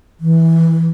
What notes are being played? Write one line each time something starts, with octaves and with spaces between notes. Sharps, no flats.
E3